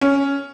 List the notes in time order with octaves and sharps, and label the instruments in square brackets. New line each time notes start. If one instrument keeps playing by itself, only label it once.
[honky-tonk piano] C#4